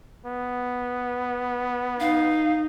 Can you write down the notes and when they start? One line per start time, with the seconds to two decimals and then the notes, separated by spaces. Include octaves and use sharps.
0.26 B3
2.00 D#4 F5